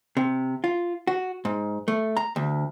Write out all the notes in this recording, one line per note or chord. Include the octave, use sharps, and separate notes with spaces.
C3
F4
F#4
G#2
A3
A#5
D2